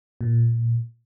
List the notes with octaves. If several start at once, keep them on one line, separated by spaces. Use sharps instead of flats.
A#2